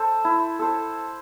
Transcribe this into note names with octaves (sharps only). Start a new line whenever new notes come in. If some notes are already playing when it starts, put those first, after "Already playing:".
Already playing: A4 C5
E4
A4 C5